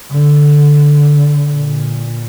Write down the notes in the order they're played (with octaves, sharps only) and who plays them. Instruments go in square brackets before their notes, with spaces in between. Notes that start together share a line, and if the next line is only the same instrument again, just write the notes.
[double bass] D3
A#2